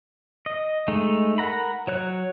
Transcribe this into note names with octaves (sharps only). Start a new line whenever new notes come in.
D#5
G#3 A3 D#4
A#4 F#5 A#5 B5
F#3 C#5 F#6